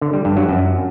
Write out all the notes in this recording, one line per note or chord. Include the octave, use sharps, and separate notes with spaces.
D3
G3
G2
F#3
F#2